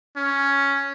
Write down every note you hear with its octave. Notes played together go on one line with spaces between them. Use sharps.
C#4